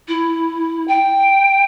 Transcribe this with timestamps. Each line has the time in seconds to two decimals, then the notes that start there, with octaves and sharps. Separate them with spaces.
0.08 E4
0.88 G5